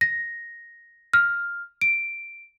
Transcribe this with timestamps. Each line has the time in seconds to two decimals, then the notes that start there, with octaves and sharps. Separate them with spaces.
0.01 A#6
1.13 F6
1.81 D7